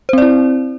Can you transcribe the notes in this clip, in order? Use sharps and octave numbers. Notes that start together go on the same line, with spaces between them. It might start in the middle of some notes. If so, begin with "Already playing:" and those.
C4 E4 C5 D5